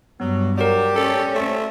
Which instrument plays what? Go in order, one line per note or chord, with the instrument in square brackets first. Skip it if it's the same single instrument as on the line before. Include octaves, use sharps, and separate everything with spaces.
[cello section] G2 [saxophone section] F#3 [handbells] B3
[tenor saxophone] F#3 [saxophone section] G4 [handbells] A#4 D5
[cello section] C#4 C#5 [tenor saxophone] A4 [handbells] D5
[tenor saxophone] A3 [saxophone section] C4